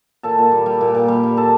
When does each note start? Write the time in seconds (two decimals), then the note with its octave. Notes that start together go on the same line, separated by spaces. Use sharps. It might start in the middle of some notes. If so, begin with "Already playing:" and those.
0.23 A#2 A4 A5
0.38 A#2
0.52 G3
0.66 G3
0.81 A#2
0.95 A#2
1.08 G3
1.23 G3
1.37 A4 A5